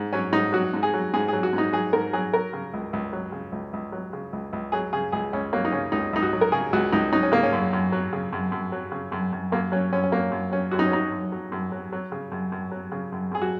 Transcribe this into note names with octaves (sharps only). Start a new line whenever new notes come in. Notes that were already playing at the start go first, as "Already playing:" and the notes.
Already playing: G#2
F#3 C#4
G#2 D#4
F#3 F#4
G#2
G#4
F#3
G#2 G#4
G#4
F#3
F#4
G#2 D#4
F#3 G#4
G#2 A#4
F#3 G#4
F#3 A#4
C#3
C#2
C#2
F#3
C#3
C#2
C#2
F#3
C#3
C#2
C#2
F#3 G#4
C#3 G#4
C#2 G#4
C#2 C#4
F#3 A#3
D#4
C#3 C#4
C#2 D#4
C#2 D#4
F#4
F#3
A#4
C#3 G#4
C#2 F#4
C#2 D#4
F#3 D#4
C#4
C#3 A#3
C#4
F#2
F#2
F#3
C#3
F#2
F#2
F#3
C#3
F#2
F#2
F#2 A#3
F#3 C#4
F#2 C#4
C#4
F#3 A#3
F#2
F#3 C#4
F#2 F#4
D#4
C#4
F#3 D#4
F#2
F#3
F#2
F#3
F#3
C#3
F#2
F#2
F#3
C#3
F#2
F#2 G#4
F#4